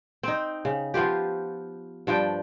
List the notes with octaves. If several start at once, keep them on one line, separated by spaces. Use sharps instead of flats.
C4 D#4
C#3
F3 B3 F4 G4
G2 F3 D4 G5